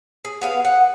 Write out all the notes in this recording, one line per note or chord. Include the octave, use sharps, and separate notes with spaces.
G#4
B3 G#4 F5
F#5